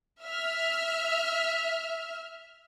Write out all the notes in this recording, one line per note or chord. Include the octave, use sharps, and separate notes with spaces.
E5 F6